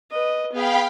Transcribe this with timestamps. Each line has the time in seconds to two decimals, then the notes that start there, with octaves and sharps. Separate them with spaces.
0.11 B4 D#5
0.52 B3 G#4 F5 G5 B5